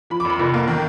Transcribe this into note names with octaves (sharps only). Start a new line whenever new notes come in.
F3 B5
D6
F2
B5
F1
A#3
D#3